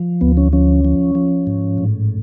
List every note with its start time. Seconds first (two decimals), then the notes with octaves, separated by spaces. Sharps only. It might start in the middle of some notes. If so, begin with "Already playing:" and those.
Already playing: F3
0.21 D2 B3
0.37 C#4
0.53 F3 C#4
0.85 F3
1.15 F3
1.47 G#2
1.78 A2